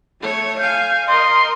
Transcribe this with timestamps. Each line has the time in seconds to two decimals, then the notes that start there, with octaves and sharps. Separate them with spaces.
0.21 A3 C#5
0.59 F5 G#5 G6
1.08 A#4 D#5 C6